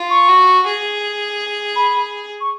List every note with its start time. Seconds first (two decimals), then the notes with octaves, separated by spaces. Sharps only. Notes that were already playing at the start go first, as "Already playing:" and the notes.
Already playing: F4
0.10 C#6
0.29 F#4
0.66 G#4
1.76 B5
2.41 C#6